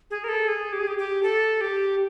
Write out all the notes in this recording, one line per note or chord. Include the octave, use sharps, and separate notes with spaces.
G#4
A#4
A4
G#4
G4
G#4
G4
G4
A4
G4